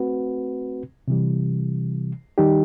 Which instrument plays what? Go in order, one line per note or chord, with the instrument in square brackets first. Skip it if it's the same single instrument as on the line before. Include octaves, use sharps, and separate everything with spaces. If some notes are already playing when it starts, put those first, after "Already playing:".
Already playing: [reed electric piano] A3 C4 F#4 B4
C3 E3 G3
D#3 G3 D#4 G4